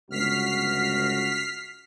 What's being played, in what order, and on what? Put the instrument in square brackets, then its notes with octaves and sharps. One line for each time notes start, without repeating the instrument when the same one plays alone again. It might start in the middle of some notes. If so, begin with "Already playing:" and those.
[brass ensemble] G1 C#2 F#4 [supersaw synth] F6 B6 C7